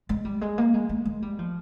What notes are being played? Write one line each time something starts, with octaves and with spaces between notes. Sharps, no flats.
G#3
G3
G#3
A#3
G#3
G#3
G#3
G3
F3